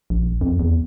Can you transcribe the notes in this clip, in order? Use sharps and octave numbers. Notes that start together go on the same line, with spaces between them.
A#1
F2
E2